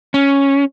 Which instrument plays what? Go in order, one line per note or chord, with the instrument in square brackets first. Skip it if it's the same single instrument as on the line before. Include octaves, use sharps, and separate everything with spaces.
[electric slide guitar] C#4